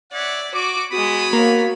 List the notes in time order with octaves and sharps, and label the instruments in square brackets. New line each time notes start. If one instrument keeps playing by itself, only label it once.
[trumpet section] C#5 E5 F#5 [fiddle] D5
[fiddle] F#4 [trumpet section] D6
[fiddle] G#3 D#6 [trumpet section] B3 G#5 B5 [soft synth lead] F#4
[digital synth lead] A#3 [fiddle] A#4 C#5